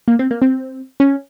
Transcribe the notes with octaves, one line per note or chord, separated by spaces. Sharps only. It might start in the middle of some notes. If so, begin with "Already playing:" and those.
A#3
C4
A#3
C4
C#4